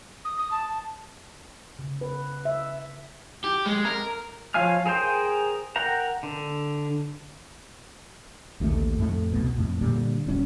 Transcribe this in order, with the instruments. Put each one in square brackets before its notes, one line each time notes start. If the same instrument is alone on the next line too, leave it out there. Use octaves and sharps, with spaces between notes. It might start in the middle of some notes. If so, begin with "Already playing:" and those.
[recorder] D#6
D#6
A5
A5
[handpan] C#3
B4
E5
[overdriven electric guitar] G4
G#3
A#4
[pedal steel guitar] F3 C#5 F5 G#5 F6
G#4 A#4 C5 G5
A#4 F#5 G5 A#5
D3
[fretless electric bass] A#1 D#2 A#2 A3
F2 A2 A3
C2 B2
F2 A2
A#2 D3 G3
D#1 G3 C#4